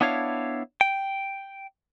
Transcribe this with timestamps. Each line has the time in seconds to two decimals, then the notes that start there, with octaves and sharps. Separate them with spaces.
0.01 B3 D4 E4 C#5 F5
0.81 G5